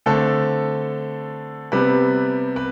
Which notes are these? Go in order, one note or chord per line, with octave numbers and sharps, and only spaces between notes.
D3 A3 C4 A4
C3 G3 B3 B4
B4